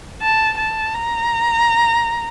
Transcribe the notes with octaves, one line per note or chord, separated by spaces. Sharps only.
A5
A5
A#5